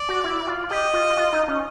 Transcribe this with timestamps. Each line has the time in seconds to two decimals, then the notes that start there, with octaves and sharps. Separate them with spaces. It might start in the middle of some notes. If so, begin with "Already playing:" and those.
Already playing: D5
0.09 F#4
0.24 E4
0.47 F4
0.70 G4 D#5
0.94 F4
1.17 F4
1.33 D#4
1.48 C#4